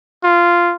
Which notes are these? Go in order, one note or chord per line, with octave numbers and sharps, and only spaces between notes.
F4